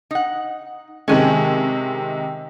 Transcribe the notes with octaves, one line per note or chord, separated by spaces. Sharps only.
D#4 F#5
C3 D#3 G#3 C#4 G#5 A5